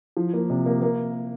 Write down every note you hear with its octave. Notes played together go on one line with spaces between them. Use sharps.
F3
A#3
C3
A#3
A#3